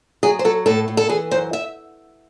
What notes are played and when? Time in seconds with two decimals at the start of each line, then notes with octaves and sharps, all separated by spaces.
0.23 F#3 G#4
0.39 C5
0.45 F#3 A4
0.66 A2 A4
0.88 A2
0.97 A4
1.09 E3 G#4
1.31 F#2 C5
1.53 E5